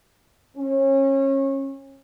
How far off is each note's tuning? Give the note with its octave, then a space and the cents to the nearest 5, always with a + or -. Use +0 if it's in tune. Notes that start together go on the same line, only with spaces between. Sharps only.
C#4 -30